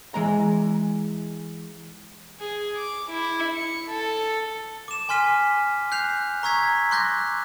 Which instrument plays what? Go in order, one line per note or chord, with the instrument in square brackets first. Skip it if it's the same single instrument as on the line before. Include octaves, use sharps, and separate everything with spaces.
[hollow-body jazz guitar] E3 G#3 A#5
[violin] G#4
D6
E4
C#7
A4
[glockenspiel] D6 E7
G#5 C6 F6 B6 D#7
F#6 G6 C7 F7
A#5 C#6 E6 G#6 B6
C6 D6 F#6 G6 A#6